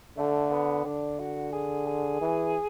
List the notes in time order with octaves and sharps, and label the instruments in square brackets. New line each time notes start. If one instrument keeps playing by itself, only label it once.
[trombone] D3 [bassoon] A3
[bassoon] B3
[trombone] D3 [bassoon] D4
[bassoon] F#4
G#4
G#4
[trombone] E3